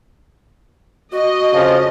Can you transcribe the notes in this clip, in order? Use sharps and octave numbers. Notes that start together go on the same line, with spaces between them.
F#4 D#5
F2 C#3 F3